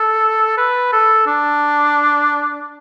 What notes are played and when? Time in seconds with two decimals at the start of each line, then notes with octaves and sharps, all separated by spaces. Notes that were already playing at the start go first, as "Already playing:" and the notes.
Already playing: A4
0.57 B4
0.93 A4
1.27 D4